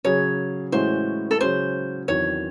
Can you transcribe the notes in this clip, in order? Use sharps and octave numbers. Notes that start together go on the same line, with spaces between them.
C#3 F#3 C#4 G#4 C#5
A2 E3 G#3 C#4 F#4 C5
A4
C#3 F#3 C#4 G#4 C5
E2 D#3 F#3 C4 C#5